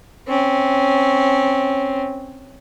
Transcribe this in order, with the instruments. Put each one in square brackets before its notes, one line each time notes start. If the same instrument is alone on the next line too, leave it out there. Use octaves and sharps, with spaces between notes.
[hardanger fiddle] C4 C#4